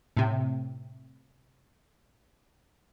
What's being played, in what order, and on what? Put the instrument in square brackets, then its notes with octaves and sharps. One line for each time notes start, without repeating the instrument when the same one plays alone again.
[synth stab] A2 C3